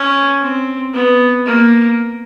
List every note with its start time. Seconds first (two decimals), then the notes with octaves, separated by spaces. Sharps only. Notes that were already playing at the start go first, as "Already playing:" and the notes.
Already playing: C#4
0.41 C4
0.93 B3
1.46 A#3